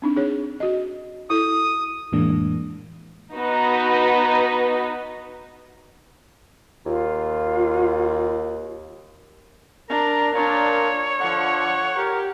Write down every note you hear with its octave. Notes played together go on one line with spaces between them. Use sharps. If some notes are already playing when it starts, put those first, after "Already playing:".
C4 D4 D#4
D#4 G#4 C#5
F#4 D#5
E4 A4 D#6
F2 A2 E3 G#3 A#3 D4
B3 D#4 F#4 B4
D#2 F4
D4 A#4 A#5
A#2 D4 C#5
D3 F3 F#5 C#6
G4 A#4